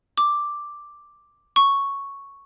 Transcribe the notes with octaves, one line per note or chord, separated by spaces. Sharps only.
D6
C#6